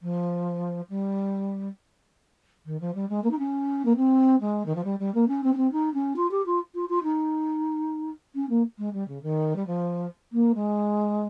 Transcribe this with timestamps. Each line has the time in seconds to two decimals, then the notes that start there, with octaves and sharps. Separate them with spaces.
0.02 F3
0.89 G3
2.66 D#3
2.80 F3
2.95 G3
3.09 G#3
3.24 A#3
3.31 D#4
3.39 C#4
3.85 A#3
3.96 C4
4.40 G#3
4.66 D#3
4.75 F3
4.84 G3
4.99 G3
5.14 A#3
5.28 C#4
5.43 C4
5.53 C#4
5.57 C4
5.72 D#4
5.94 C#4
6.16 F4
6.31 G4
6.46 F4
6.75 F4
6.89 F4
7.03 D#4
8.35 C#4
8.49 A#3
8.78 G#3
8.93 G3
9.08 C#3
9.23 D#3
9.56 G3
9.67 F3
10.32 A#3
10.54 G#3